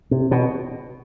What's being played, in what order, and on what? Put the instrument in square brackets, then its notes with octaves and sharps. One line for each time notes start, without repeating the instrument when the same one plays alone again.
[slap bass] C3
B2